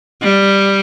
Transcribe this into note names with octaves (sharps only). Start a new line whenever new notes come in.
G3